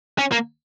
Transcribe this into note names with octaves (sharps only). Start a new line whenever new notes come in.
C#4
A#3